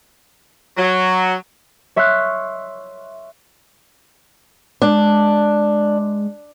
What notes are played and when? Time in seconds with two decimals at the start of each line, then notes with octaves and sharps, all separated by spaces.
0.77 F#3
1.96 C#5 E5 C6 C#6 F6 F#6
4.82 G#3 D4